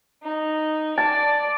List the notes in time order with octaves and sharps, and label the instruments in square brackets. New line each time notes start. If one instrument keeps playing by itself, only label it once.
[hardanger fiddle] D#4
[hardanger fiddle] D5 [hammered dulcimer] A5